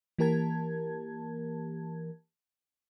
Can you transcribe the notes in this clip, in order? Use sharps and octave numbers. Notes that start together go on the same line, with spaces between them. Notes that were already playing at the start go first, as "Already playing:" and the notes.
E3 A#3 G4 A#4 A5 G#6